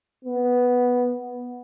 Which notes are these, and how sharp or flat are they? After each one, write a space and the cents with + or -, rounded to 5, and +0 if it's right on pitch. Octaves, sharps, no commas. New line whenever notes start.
B3 -5